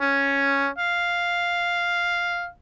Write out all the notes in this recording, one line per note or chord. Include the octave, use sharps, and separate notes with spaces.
C#4
F5